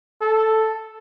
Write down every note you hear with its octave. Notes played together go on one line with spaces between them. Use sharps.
A4